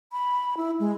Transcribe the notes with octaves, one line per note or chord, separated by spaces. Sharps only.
B5
E4
G#3